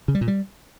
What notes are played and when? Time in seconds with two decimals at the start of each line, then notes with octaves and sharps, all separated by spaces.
0.08 C#3
0.15 G3
0.21 A#2
0.28 G3